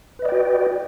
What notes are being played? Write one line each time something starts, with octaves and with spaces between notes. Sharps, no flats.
F#4 B4 D5 D#5 G5